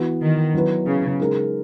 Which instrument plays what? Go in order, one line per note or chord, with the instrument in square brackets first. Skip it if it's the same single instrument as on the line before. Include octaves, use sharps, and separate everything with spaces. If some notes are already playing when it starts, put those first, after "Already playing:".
Already playing: [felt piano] E3 B3 F#4 B4
[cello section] D#3
[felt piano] F#3 B3 E4 B4
[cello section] C#3
[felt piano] G#3 D#4 A#4